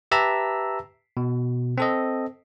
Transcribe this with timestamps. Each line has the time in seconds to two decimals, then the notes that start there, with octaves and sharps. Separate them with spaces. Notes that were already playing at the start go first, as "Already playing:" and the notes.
0.11 G4 B4 E5 A5 A#5 E6
1.17 B2
1.78 C4 A4 D#5